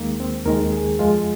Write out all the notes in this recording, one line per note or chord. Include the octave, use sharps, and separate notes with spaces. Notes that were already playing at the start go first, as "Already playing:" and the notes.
Already playing: D#2 D#3 G#3 A#3
C4
D#2 D#3 G#3 A#4
G#4
F2 F3 G#3 F4